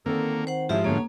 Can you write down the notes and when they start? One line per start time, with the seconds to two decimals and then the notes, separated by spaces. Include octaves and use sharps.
0.06 D3 D#3 A#3 C4 A4
0.47 C5 F#5
0.69 G#2 F3 A3 C#4 E4 G4 E5
0.84 A2 D3 A#3 B3 C#4 C#5